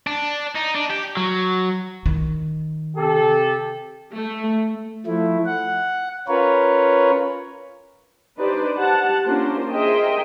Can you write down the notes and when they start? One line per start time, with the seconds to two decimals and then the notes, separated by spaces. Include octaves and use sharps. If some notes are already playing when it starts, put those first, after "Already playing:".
0.07 D4
0.56 D#4
0.76 D4
0.91 G4
1.17 F#3
2.06 D#3
2.97 C3 G4 A4
4.14 A3
5.06 F3 A3 E4
5.46 F#5
6.28 C#4 F4 A#4 B4 C#5
8.38 D4 D#4 G4 B4 C5 D5
8.76 G4 F#5 A5
9.25 A#3 C#4 D4 F4 A#4 C5
9.72 G#4 A#4 C5 D#5 E5 G5